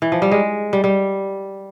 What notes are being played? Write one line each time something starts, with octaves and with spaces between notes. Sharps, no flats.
E3
F3
G3
G#3
G3
G3